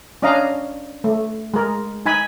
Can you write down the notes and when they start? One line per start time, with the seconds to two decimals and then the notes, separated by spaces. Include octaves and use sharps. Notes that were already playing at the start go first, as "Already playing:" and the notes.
0.22 C#4 D4 D#5 F5 A#5
1.04 A3
1.54 G#3 A#4
2.06 D#4 G#5 B5